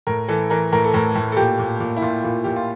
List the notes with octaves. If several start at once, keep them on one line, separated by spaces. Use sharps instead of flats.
A2 A#4
E3 A4
E3 A#4
A2 A#4
A4
A2 A#4
A2
A4
A#2 G4
A#2
A#2
E4
A#2 F4
A#2
A#2 G4
F4